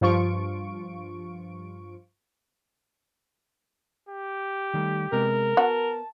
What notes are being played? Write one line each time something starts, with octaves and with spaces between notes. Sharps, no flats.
G2 F3 F4 C#6 D7
G4
D#3 G3 A3
C3 G#3 B3 A#4
B3 F#4 A5